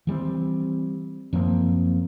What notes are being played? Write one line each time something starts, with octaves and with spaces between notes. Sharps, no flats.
E3 G3 G#3 C4
F#2 F3 A#3 C4